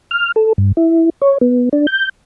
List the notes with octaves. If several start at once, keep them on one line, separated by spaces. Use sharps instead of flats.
F6
A4
G2
E4
C#5
B3
D4
G6